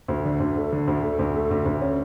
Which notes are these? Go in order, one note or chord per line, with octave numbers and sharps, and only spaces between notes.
D2
D3
D2
A3
D3
D2
A3
D2
A3
D2
D2
C#4